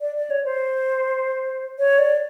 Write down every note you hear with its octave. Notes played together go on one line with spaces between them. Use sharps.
D5
D5
C#5
C5
C#5
D5